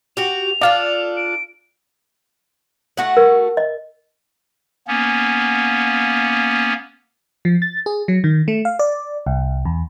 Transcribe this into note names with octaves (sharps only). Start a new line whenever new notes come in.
F#4 G4 F7
D4 F4 A4 D5 F5
D7
A3 F#4 F#5
A#4
D#5
A#3 B3 C#4
F3
A6
G#4
F#3
D#3
A3
F5
D5
C2
E2